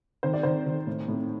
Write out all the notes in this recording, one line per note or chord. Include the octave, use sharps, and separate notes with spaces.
D#3 C5
D5
D#3 C5
D#3
A2
A2